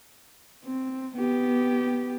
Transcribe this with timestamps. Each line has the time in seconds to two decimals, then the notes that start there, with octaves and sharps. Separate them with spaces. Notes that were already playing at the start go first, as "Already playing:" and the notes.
0.65 C4
1.16 B3 G4